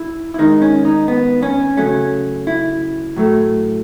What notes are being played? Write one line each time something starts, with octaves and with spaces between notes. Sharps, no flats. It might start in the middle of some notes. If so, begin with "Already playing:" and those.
Already playing: E4
E4
D#3 G#3 D#4
C#4
D#4
B3
C#4
C#3 F#3 A3 C#4
E4
A2 F#3 A3